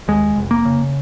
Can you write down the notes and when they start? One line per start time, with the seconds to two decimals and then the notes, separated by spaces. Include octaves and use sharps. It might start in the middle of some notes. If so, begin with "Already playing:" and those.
0.08 D#2 G#3
0.36 F1
0.51 A#3
0.65 C#3